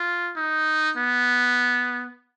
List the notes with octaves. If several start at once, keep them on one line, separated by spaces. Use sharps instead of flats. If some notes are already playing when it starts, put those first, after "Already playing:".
Already playing: F4
D#4
B3